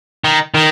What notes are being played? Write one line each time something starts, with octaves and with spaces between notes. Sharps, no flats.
D#3
D#3